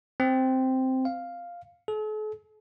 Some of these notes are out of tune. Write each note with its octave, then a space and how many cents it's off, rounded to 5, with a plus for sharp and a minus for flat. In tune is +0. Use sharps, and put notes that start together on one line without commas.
C4 -5
F5 +0
A4 -45